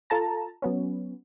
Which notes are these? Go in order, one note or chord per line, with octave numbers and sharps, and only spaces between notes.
F4 A4 A5 A#5
F#3 B3 C#4